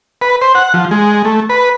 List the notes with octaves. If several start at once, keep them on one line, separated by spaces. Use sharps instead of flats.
B4
C5
F#5
F3
G#3
A3
B4